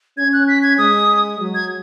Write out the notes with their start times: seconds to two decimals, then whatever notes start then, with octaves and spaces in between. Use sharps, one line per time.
0.18 C#4 G#6
0.33 F#6
0.48 B6
0.63 G#6
0.78 G#3 D#6
1.39 F#3
1.55 G#6